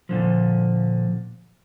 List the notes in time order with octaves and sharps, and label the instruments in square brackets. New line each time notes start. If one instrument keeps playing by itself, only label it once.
[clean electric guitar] A#2 D3 F3